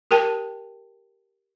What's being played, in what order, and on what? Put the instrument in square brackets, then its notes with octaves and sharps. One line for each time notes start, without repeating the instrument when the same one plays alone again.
[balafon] G4 A#4 G5 A5